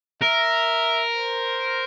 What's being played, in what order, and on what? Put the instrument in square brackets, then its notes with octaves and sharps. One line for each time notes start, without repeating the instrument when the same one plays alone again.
[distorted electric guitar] A#4 [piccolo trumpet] E5
[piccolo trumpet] C5